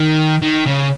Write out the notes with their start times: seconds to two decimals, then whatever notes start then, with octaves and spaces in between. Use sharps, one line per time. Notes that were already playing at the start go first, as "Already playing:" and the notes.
Already playing: D#3
0.42 D#3
0.66 C#3